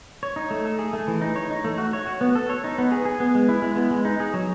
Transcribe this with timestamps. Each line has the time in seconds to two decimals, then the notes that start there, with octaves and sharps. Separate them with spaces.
0.23 C#5
0.36 D#4
0.51 A3
0.65 A4
0.79 G#4
0.93 A3
1.08 E3
1.21 D#4
1.36 C#5
1.51 D#4
1.64 A3
1.78 F#4
1.93 C#5
2.07 F#4
2.21 B3
2.35 A4
2.49 C#5
2.64 D#4
2.78 B3
2.92 G#4
3.05 G#4
3.20 B3
3.35 G#3
3.49 E4
3.62 G#3
3.76 B3
3.91 G#3
4.05 D#4
4.20 G#4
4.34 F#3